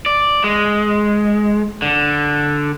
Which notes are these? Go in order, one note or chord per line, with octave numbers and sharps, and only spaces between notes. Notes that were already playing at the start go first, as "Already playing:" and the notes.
D5
G#3
D3